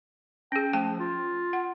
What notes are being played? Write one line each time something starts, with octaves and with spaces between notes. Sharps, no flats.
C#4 G#4 G5
F3 A3 G5 A5
F4
F#5